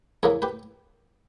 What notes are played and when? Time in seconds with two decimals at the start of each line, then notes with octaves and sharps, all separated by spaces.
0.23 E2 C#3 E3 A#4 C#5
0.42 G4 B4